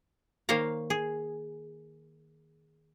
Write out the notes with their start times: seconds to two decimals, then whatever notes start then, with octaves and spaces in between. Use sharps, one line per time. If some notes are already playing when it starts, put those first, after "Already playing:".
0.49 D#3 A#3 C5 C#5 F5 A#5
0.90 G#4